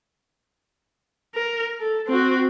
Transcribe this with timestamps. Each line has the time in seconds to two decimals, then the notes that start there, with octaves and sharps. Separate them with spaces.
1.35 A#4
1.80 A4
2.08 C4 F#4